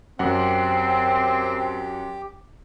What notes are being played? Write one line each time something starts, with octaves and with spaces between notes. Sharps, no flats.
F#2 C4 G4 F#5